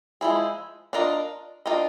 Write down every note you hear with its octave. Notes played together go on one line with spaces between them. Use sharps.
F3 G#3 B3 E4 G#4
D4 F4 A#4 D#5
D4 F4 A#4 D#5